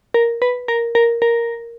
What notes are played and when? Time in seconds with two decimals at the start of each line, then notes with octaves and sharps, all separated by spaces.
0.14 A#4
0.42 B4
0.68 A#4
0.95 A#4
1.22 A#4